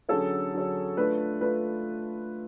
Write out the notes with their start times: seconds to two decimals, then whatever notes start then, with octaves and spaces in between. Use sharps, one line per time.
0.09 D3 F#3 C#4 G#4 A4 C#5
0.54 D3 F#3 C#4 G#4 C#5
0.97 A3 D4 F4 B4
1.41 A3 D4 F4 B4